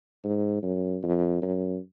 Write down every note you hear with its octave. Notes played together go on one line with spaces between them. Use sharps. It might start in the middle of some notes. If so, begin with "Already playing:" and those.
G#2
F#2
F2
F#2